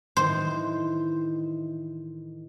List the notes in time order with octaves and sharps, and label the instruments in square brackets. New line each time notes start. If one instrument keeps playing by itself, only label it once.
[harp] A2 D#3 E3 [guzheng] C5